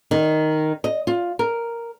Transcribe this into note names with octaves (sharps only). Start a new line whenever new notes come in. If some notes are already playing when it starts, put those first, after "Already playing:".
D#3
D#5
F4
A#4